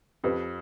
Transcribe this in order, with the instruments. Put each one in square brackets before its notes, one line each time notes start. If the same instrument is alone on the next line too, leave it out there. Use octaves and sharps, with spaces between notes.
[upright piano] F2 [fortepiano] G4 B4